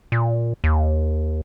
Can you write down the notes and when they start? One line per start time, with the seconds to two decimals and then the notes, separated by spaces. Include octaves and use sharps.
0.12 A#2
0.64 D#2